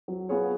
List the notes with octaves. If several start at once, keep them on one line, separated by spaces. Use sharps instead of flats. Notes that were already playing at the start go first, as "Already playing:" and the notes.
F#3
B3 F4 G#4 C#5